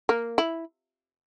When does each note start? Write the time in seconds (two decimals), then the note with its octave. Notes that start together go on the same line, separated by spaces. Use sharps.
0.09 A#3
0.38 E4